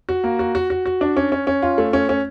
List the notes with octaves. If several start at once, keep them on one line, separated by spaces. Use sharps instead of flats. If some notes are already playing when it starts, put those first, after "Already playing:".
F#4
A#3
F#4
F#4
F#4
F#4
D4
C#4
C#4
C#4
F4
A3
C#4
C#4